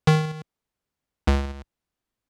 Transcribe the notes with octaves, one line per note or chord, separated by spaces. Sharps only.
D#3
C#2